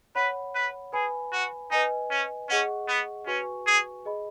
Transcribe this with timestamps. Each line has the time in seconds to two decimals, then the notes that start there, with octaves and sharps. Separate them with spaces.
0.15 B4 C#5 F#5 B5
0.55 B4
0.93 G#4 B4 G#5 B5
1.32 F#4
1.71 D#4 B4 D#5 G#5
2.10 C#4
2.49 C#4 G#4 D#5 F#5 C#6
2.88 B3
3.27 C#4 F#4 B4 G#5 C#6
3.66 G#4
4.05 G#4 D#5 B5